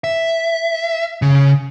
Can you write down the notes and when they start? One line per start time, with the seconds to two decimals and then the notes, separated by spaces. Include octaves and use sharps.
0.04 E5
1.22 C#3